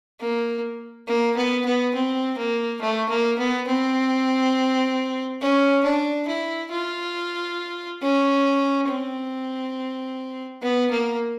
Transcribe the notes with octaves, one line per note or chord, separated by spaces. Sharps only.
A#3
A#3
B3
B3
C4
A#3
A3
A#3
B3
C4
C#4
D4
E4
F4
C#4
C4
B3
A#3